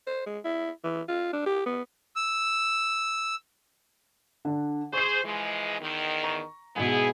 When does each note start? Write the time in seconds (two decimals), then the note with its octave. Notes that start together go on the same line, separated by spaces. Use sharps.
0.07 C5
0.26 G#3
0.45 E4
0.84 E3
1.08 F4
1.33 D4
1.46 G4
1.66 B3
2.16 E6
4.45 D3 D4
4.93 G#4 C5 C#6 C7
5.24 E3 F3 G#3
5.81 E2 D#3
6.23 A#5 C#6
6.76 G#2 B2 B3 E4 G#4